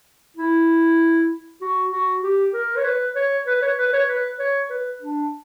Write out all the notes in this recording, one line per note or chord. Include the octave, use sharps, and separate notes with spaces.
E4
F#4
F#4
G4
A#4
C#5
B4
C#5
B4
C#5
B4
C#5
B4
C#5
B4
D4